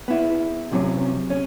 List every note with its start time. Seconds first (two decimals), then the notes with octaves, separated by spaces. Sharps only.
0.08 B3 E4
0.72 C3 F#3 C#4
1.30 C#4